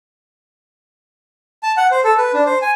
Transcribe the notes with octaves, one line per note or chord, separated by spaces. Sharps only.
A5
F#5
C5
A4
B4
D4
C5
G#5